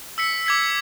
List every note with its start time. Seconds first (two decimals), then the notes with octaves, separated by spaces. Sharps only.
0.18 E6 B6 C#7
0.47 D6 G#6 B6